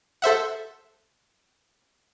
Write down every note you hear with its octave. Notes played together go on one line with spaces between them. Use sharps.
A4 C5 E5 F#5